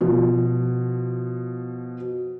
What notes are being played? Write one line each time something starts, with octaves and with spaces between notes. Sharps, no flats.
B2 F3